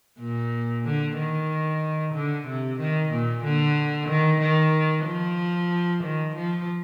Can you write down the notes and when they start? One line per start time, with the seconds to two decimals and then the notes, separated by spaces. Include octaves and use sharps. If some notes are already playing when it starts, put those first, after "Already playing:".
0.19 A#2
0.85 D3
1.17 D#3
2.14 D3
2.47 C3
2.79 D#3
3.12 A#2
3.44 D3
4.09 D#3
4.41 D#3
5.06 F3
6.03 D#3
6.35 F3